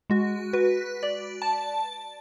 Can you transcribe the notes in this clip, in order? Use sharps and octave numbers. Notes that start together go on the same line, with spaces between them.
G#3 F#4
F#4 B4
D5
A5